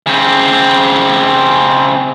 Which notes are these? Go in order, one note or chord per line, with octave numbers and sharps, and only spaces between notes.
C#3 C4